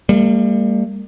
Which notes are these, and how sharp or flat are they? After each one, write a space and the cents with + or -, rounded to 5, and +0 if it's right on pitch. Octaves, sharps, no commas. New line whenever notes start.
G3 +30 A#3 -35